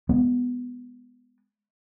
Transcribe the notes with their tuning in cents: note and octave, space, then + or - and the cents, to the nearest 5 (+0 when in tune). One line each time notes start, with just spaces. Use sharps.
G#3 +0 B3 +0